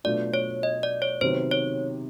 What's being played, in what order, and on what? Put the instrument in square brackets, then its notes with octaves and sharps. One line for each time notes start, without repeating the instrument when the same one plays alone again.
[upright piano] B2 F#3 A3 D4 F4 [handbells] D5
[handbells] C#5
D#5
D5
C#5
[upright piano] C3 D#3 F#3 B3 [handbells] C5
[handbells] C#5